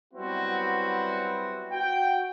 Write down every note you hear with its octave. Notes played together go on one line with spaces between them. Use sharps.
F#3 G3 B3 C4 E4 F#4
F#4 G5